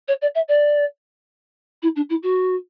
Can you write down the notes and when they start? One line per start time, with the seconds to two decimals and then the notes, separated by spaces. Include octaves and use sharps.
0.08 C#5
0.22 D5
0.35 E5
0.48 D5
1.82 E4
1.96 D4
2.10 E4
2.23 F#4